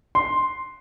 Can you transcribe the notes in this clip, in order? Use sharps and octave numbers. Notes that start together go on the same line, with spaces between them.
C6